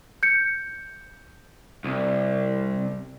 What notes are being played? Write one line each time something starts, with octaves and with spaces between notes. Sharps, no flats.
G6 C#7
C2